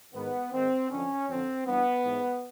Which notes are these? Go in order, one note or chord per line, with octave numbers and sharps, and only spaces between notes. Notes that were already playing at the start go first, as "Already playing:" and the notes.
G#2 D#3 B3
G#2 D#3 C4
F2 D3 C#4
F2 D3 C4
G2 E3 B3
G#2 E3